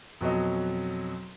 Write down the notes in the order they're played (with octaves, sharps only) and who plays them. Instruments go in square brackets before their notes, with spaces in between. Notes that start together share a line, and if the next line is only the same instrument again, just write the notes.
[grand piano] F2 B2 F#3 D#5